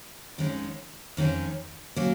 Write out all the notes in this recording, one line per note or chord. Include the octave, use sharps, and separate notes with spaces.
F2 D#3 G#3 C#4
F2 D#3 G#3 C#4
F#3 A#3 C#4